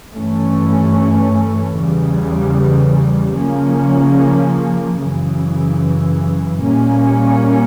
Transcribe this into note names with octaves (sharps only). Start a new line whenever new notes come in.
G2 E3 A3 C#4
E2 C#3 E3 G3
C#3 F3 A#3 C#4
F#2 C#3 E3
A#2 G3 A#3 C#4